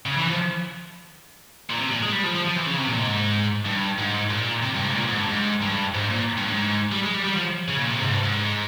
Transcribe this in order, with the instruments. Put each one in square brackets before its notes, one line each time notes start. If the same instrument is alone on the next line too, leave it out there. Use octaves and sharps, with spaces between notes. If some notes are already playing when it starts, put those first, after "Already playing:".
[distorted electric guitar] C#3
E3
F3
A#2
C3
A#2
G#3
G3
F3
F3
F3
E3
C#3
C3
A#2
G#2
G2
G#2
A#2
C3
G2
G#2
A#2
G#2
G2
G#2
G2
G#2
A#2
G2
G#2
G3
G#3
G3
G3
F3
C#3
A#2
C3
G#2
G2
G#2